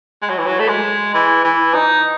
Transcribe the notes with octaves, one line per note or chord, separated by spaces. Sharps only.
G#3
F#3
E3
F#3
A3
G#3
E3
E3
D#4